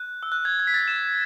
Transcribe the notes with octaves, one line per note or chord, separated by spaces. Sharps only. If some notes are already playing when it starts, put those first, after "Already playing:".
Already playing: F#6
E6
F#6
G#6
G#6
B6
A6
E7